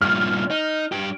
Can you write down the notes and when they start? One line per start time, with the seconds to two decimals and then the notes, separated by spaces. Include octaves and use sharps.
0.01 G2 A#2 F6
0.51 D#4
0.92 G2 G4